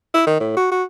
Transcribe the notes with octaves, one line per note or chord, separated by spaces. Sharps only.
E4
D#3
A2
F#4
F#4